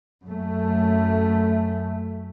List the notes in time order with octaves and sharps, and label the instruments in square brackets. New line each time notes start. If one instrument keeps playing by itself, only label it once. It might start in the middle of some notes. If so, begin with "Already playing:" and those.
[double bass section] F#2 A3